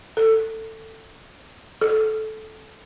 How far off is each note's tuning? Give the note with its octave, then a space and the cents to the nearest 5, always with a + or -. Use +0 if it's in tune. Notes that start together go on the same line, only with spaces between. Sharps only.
A4 +15
A4 -15